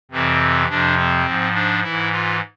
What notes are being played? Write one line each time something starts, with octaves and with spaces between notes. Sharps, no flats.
F2 C3 E3 C4
F2 C3 F3 D4
C4
G#2 F3
D4
G#2 E3 E4
F4